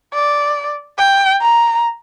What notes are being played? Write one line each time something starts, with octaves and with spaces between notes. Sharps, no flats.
D5
G5
A#5